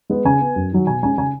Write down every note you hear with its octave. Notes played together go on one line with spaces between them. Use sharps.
G#3 B3
C#3 G#5
B3
F#2
D#3 F#3
B2 G#5
G#3 C#4 G#5
C#3 G#5